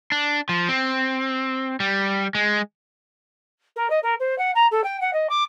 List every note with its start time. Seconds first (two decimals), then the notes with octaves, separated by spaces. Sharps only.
0.12 D4
0.49 F3
0.69 C4
1.80 G3
2.35 G#3
3.76 A#4
3.90 D#5
4.03 A#4
4.20 C5
4.38 F#5
4.55 A#5
4.71 A4
4.84 G5
5.01 F#5
5.13 D#5
5.30 D6